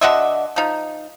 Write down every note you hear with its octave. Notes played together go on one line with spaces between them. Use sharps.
D3 F#4 D#5 E5
F3 D#4